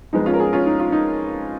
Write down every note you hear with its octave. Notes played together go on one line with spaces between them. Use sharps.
F2 F3 G#3 B3 D#4
C#4 F4
A#4
F4 G#4
C#4 F4
D#4
F4
D#4